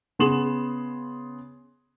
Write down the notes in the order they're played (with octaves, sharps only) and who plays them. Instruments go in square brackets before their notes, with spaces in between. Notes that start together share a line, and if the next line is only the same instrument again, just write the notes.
[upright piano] C#3 B3 G#4 C6 E7 F#7